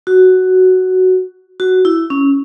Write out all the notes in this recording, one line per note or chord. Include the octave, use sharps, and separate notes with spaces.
F#4
F#4
E4
C#4